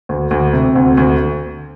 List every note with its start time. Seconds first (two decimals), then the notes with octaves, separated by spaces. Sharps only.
0.09 D2
0.31 D2
0.53 C3
0.75 D2
0.97 D2